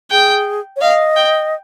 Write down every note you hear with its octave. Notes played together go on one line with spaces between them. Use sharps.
G#4 G5
C#5
D#5 F5
G5